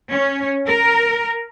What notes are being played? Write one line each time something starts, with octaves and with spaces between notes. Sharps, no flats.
C#4
A#4